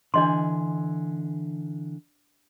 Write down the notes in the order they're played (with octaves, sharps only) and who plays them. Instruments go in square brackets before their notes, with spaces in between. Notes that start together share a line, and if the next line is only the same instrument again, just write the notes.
[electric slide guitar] D3 E3 G#5 [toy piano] D4 D#5 C6